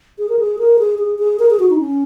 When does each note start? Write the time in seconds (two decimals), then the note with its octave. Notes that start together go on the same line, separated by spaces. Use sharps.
0.19 G#4
0.29 A#4
0.39 G#4
0.59 A#4
0.79 G#4
0.99 G#4
1.19 G#4
1.39 A#4
1.50 G#4
1.60 F#4
1.70 D#4
1.80 C#4